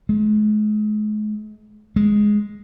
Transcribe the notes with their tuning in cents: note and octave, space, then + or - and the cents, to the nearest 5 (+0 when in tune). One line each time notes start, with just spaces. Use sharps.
G#3 +40
G#3 +0